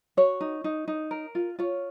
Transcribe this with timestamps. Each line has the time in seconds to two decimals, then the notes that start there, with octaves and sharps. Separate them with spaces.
0.17 F#4 C#5
0.41 D#4
0.64 D#4
0.88 D#4
1.11 A#4
1.35 F4
1.59 F4 C#5